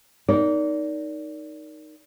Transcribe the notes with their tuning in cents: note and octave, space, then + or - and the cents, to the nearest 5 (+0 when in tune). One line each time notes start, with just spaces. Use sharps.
D#4 +0 A#4 +0 D5 -25